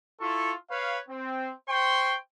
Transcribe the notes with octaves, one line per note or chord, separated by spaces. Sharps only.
E4 F4 A4 C#6
B4 C#5 F5
C4
C5 G5 C6 C#6